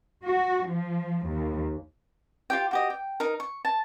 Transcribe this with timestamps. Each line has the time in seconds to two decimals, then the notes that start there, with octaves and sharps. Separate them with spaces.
0.24 F#4
0.67 F3
1.27 D#2
2.50 F4 G4 G5
2.71 F#4 G4 D#5
2.90 G5
3.20 D#4 A#4
3.40 C#6
3.65 A5